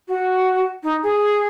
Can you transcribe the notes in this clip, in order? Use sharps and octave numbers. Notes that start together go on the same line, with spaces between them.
F#4
D#4
G#4